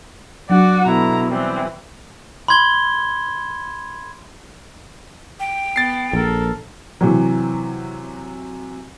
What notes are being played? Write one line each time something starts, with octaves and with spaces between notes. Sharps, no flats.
F#3 D4 F#4 D5 F#5
B2 D3 E4 A#5
E3 G3 C4
B5 C6 G#6 G7
G5
B3 A6 C7
A#1 A4 A#4
C3 E3 F#3